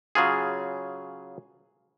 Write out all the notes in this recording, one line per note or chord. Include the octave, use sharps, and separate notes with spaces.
C#3 F#3 F4 G#4